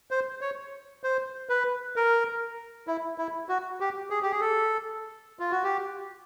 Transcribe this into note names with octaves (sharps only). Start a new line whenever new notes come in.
C5
C#5
C5
B4
A#4
E4
E4
F#4
G4
G#4
G4
G#4
A4
F4
F#4
G4